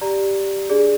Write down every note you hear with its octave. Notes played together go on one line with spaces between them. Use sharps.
G4 D5 A#5
D4 G#4 D5